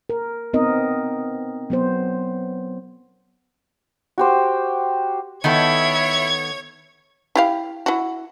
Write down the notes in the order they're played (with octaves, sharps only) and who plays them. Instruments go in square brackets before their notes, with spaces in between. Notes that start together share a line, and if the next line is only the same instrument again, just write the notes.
[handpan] A#4
B3 C4 D#4 A#4 D#5
F#3 B3 C5
[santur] F#4 G4 C5
[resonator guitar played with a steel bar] D#3 B3 A4 [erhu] E4 [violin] C#5 G#6
[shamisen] E4 G4 F5
E4 F#4